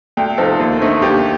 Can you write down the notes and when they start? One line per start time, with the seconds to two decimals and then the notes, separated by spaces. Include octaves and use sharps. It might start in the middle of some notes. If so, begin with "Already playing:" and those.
0.17 D2 G5
0.38 C3 F3 C4 D#4 A4
0.60 D#2
0.81 D3 A3 C4 D#4
1.02 D#2 G4